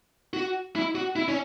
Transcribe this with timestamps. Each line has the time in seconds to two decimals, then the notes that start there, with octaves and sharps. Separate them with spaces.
0.33 F#4
0.76 E4
0.95 F#4
1.16 E4
1.28 C#4